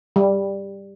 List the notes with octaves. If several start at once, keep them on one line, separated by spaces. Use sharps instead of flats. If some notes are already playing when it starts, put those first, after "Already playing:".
G3